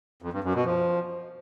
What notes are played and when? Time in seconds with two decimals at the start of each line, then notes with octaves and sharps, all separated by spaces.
0.22 F2
0.33 G2
0.44 F#2
0.55 B2
0.65 F3